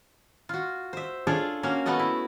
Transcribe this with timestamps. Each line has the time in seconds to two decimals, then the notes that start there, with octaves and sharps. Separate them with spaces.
0.49 F4 F#4
0.93 C5 E5
1.27 D4 F4 G#4 A4 C#5 D5
1.63 A#3 C#4 F#4 F5
1.86 A3 B3 F#4 A4 D#5
1.99 E4